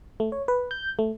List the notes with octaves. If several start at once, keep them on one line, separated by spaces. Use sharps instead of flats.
A3
C#5
B4
G6
A3